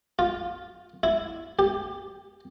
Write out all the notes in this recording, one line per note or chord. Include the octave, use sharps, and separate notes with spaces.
F4
E4
G4